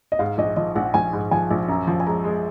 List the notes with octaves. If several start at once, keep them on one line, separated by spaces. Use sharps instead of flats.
D#5
G#2 F5
A#1 D#5
F3 D#5
A#1 F#5
A#1 G#5
G#2
F3 G#5
A#1
F#2 A#5
F3
G#5
G#3 A#5
G#3